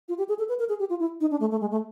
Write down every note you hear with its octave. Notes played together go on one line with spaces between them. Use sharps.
F4
G4
G#4
A4
B4
A#4
G#4
G4
F4
E4
D#4
D4
A3
A3
G#3
A3